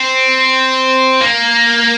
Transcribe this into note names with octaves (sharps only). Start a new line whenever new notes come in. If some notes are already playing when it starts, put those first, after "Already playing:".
Already playing: C4
A#3